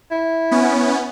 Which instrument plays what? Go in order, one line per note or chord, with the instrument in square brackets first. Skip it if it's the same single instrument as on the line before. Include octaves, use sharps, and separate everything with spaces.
[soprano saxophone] E4
[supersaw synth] B3 C#4